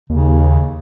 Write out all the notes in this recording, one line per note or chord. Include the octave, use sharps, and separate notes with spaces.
D#2 C#3